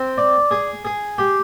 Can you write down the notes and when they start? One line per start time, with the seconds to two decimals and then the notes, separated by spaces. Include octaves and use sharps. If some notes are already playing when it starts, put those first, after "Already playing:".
Already playing: C4
0.18 D5
0.51 G#4
0.85 G#4
1.18 G4